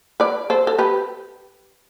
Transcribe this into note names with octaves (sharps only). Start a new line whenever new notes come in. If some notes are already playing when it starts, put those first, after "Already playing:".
B4 D5
A4 C5
A4
G4 B4